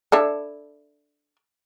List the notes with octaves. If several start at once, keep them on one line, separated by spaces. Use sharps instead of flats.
D4 E4 A4